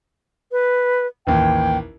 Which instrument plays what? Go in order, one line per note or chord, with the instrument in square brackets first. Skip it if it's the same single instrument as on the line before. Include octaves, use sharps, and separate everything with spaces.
[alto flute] B4
[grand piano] A1 D#2 [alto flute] G5